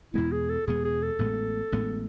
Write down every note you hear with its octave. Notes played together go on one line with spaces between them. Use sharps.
E2 B2 G#3 B3 E4
G#4
A4
E2 B2 G#3 B3 G#4
G#4
A4
A1 A2 G#3 B3
A1 A2 G#3 B3